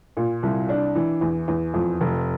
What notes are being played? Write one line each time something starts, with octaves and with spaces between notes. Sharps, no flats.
A#2
C2
D4
E3
E2
E2
F2
F1